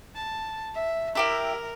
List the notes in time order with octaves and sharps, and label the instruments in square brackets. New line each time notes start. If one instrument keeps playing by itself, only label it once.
[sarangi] A5
E5
[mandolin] E4 G4 E5 [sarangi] A#4